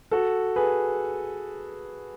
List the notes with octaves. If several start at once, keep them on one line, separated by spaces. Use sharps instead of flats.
F#4 A4
G#4 B4